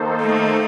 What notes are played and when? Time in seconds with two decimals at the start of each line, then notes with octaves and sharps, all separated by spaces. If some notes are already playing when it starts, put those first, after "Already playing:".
Already playing: D#3 A#3 D#4 A4 C5
0.21 A3